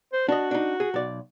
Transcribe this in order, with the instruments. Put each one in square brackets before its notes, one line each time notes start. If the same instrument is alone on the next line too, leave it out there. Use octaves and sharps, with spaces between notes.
[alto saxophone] C5
[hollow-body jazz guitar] D4 D#5 [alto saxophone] F#4
[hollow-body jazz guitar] D4 D#4
G#4
B1 D5